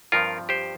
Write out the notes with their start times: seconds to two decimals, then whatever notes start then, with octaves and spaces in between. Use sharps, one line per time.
0.12 G2 F3 C4 F4 A#4
0.49 G4 C5